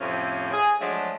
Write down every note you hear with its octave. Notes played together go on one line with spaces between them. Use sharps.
F2 A2 C3 F3 C#4
G#4
F3 F#3 G#3 A3 D4